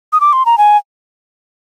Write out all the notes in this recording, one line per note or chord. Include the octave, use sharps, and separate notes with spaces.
D#6
D6
C6
A#5
G#5